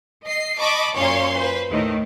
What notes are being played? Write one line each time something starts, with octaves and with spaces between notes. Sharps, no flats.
D#5 C7
D#5 A5 B5 C#6 D6
F#2 A#2 C#4 C#5 F5 C6
B4 C5
D#2 A2 D#3